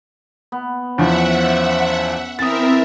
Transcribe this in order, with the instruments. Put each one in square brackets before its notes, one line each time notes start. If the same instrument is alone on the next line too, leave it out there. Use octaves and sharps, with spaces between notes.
[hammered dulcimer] B3
[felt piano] E2 F3 [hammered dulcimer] C#4 [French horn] C5 [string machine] E5 F#5
[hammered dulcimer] E3 [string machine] C4 A#4 E5 [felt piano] D#6 A6